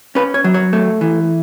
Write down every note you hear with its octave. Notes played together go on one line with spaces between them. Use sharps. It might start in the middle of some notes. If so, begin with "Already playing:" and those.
C#4 B4
C#5
F#3
C#5
A3
E3